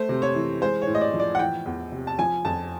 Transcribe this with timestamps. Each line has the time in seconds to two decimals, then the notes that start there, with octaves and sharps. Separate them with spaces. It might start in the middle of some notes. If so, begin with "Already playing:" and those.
Already playing: A3 C5
0.09 C3
0.22 C#5
0.35 E3
0.61 G#3 C5
0.82 C#5
0.87 A2
0.95 D#5
1.01 D5
1.14 F3
1.20 D5
1.35 F#5
1.39 E3 G5
1.66 E2
1.92 C3
2.07 A5
2.18 F3 G#5
2.45 F2 A5